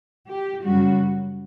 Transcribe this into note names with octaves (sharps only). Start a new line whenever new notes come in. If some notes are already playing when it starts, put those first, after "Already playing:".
G4
F#2 C#3 G3 F#4